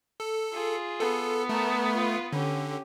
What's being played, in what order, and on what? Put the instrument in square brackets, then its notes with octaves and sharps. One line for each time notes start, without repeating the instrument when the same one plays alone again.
[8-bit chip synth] A4
[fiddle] F4 G#4
[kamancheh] B3 [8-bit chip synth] A4
[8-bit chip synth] A3 [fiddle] A4 A#4
[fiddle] F4 B4
[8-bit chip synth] D3 [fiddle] C#4 G4